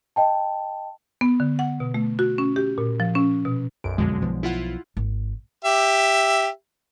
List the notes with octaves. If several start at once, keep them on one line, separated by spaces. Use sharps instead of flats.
D#5 G5 A5
B3
D3
F#5
B2
A3
F#4
C#4
G4
A#2
F3
C#4
B2
B1 F#2 D7
F2 B2 D3 F#3 G#3
B1 F3 B3
E4 F4 F#5
G#1
G4 E5